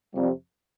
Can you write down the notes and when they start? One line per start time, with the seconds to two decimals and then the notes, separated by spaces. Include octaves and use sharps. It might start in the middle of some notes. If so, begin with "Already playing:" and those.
0.15 F2 C3 G3